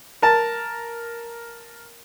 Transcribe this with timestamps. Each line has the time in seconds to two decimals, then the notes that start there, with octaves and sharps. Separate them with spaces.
0.22 A#4 A5